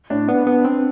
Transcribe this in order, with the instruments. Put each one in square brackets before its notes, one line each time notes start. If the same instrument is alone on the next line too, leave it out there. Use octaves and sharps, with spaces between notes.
[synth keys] A2 [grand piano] D4
[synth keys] B3 [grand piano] D4
[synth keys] B3
C4